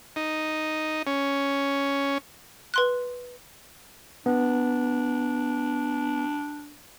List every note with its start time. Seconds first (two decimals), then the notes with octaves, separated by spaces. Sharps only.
0.16 D#4
1.07 C#4
2.74 B4 C6 F#6
4.26 B3 D4